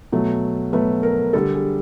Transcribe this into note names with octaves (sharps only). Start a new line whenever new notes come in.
B2 F#3 A3
B2 F#3 A3 B4
A#4
D3 G3 A4
G#4